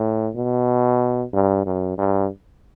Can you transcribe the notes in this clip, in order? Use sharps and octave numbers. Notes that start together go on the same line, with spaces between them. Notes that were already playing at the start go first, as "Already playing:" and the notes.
Already playing: A2
B2
G2
F#2
G2